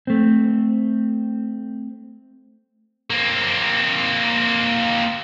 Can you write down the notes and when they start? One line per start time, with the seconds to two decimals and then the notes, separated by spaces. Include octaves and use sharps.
0.07 A3 C4
3.10 A#3 C4